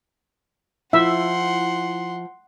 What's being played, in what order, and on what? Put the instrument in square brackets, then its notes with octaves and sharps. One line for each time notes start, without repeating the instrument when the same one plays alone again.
[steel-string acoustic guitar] F3 [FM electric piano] E4 [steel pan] E5 [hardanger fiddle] F#5 C6